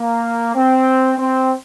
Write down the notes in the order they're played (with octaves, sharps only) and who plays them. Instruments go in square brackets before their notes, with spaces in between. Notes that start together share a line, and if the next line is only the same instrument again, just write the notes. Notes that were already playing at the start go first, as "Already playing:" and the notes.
Already playing: [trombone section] A#3
C4
C4